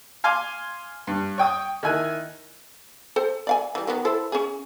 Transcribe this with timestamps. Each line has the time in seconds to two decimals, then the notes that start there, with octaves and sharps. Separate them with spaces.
0.24 F5 G#5 C6 D6
1.07 G2
1.38 C#5 G5 D#6
1.83 D#3 E4 G#5 F#6
3.16 A4 C5 G5
3.47 D5 F5 G#5
3.75 E3 G3
3.87 D#3 F#3 B3
4.05 E4 A4 C5
4.32 C#4 G#4